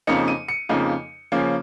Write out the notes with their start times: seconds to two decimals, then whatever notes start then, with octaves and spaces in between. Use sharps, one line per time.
0.07 F2 C#3 F3 A#3 D#4 C#7
0.28 D#7
0.48 C#7
0.69 F2 C#3 F3 A#3 D#4
1.32 C#3 F3 A#3 C#4